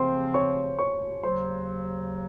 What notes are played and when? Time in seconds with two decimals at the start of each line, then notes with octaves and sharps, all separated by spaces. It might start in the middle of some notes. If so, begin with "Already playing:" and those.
Already playing: C#3 F3 C4 C5 C6
0.34 C#5 C#6
0.79 C#5 C#6
1.23 D#2 C#3 F#3 C5 C6